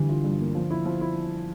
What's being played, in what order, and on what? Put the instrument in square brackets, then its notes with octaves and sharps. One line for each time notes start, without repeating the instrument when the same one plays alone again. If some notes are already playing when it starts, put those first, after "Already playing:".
Already playing: [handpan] D3 [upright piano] E3 G3
[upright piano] F4
G2
A#3
F3
E4
F3
E4